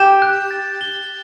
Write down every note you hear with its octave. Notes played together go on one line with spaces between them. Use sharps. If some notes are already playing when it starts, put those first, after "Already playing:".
Already playing: G4 E7
F#6
A6
G7